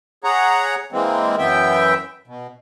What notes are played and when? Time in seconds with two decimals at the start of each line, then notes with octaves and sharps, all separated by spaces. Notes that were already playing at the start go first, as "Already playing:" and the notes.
0.24 G#4 C#5 F#5 A#5
0.92 E3 G#3 A#3 C4
1.38 F#2 E3 B3 E5 G5
2.27 B2